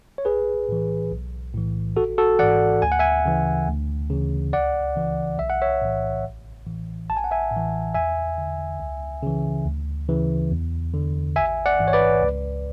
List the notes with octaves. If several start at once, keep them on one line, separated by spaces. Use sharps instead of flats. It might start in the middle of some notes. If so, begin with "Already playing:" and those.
C#5
B1 G#4 B4
A2 E3
B1
A2 E3
G#1 F#4 A4
F#4 A4
G#2 E3 D5 F#5
D2 G#5
F#5
E5 G#5
C#3 E3
D2
C#3 E3
C#2 D5 F#5
C#3 E3
B1 E5
F#5
C#5 E5
A2 E3
A1
A2 E3
A1 A5
G#5
F#5
E5 G#5
A2
E3
E2 E5 G#5
D3
C#2
C#3 E3
D2
C#3 E3
E2
D3
A1 E5 G#5
D5 F#5
G#2 E3
C#5
B4 D5
C#2